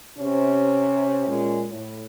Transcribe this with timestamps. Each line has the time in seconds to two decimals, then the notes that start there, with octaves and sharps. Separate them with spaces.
0.18 C3 C#4
1.27 A#2 G#3
1.69 A2